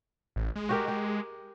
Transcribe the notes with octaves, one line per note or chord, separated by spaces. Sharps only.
A1
G#3
F#4 G4 A#4
G4